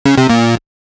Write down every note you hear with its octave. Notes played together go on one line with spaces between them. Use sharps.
C#3
C3
A#2